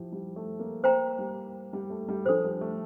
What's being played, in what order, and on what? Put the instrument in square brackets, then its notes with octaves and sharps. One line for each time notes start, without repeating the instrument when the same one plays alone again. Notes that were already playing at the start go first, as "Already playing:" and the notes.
Already playing: [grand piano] F3 E4 G4
G3
A3
A#3
[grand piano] A#3 [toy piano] C5 G5 A#5
[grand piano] G3
G3
A3
G3
[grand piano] F3 [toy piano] D4 A4 C5
[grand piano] G3
A3